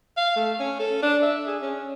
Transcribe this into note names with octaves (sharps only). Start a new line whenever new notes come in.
F5
A3
C#4
A4
D4
E5
G#4
C#4